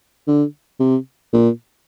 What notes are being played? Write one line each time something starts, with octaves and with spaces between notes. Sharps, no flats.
D3
C3
A#2